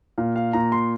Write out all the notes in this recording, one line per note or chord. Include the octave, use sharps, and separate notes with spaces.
A#2 F5
F5
A#2 A#5
C6